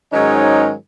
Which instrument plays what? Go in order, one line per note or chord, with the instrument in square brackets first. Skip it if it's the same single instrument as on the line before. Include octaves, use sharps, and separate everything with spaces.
[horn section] G#2 D#3 F#3 G#3 C#4 D#4